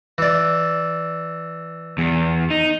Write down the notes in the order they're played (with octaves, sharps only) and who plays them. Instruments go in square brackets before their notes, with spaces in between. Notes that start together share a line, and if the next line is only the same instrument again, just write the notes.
[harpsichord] E3 D5
[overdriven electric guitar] E2
D#4